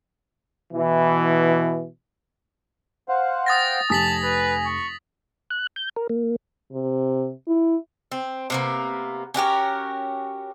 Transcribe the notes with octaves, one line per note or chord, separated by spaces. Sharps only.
B2 E3
C5 F5 F#5
G5 D#6 A6 A#6
F1 G4 G#5 A5 D#6 B6 F#7
B4
C#6
F#6
G6
A#4
A#3
C3
E4
C4
C3 A#3 B3
C#4 F#4 G4 A#4